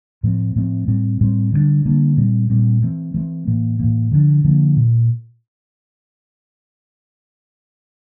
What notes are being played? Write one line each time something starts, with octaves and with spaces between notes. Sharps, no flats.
A2 F3 A3 C4
A2 F3 A3 C4
A2 G3 C4
A2 G3 C4
D3 G3 A#3 D4
D3 G3 A#3 D4
A#2 G3 C4
A#2 G3 C4
E3 A3 C4
E3 A3 C4
A2 E3 A#3
A2 E3 A#3
D3 F3 A#3 D4
D3 F3 A#3 D4
A#2